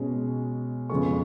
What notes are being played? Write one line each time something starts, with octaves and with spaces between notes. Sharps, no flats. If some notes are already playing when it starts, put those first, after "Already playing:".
Already playing: B2 G#3 C#4
F2 C#3 G#3 B3 C#6